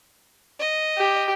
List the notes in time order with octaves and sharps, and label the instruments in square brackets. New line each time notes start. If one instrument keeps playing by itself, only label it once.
[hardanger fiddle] D#5
[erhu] G4